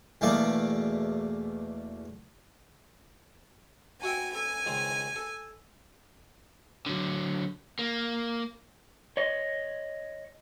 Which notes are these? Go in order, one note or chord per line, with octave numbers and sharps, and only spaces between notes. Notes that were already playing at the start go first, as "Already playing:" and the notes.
E2 B2 A3 A#3 D5
F#4 E5 G5 G#5
A4 G#5
C#2 D#3 C5
A4
D3 F#3
A#3
C#5 D#5